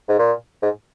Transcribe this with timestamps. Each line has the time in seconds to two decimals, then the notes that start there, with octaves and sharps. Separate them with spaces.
0.08 G#2
0.19 A#2
0.62 G#2